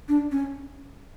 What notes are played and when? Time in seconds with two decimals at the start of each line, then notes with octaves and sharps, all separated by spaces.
0.09 D4
0.32 C#4